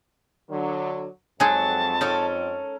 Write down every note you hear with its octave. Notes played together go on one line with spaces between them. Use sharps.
D3 F#3
F2 F#3 G#3 D#4 G#4 A5
C#4 D#4 A4 A#4